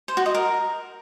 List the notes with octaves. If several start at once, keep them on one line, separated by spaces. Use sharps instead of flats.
C5
F#4
D#5
A#4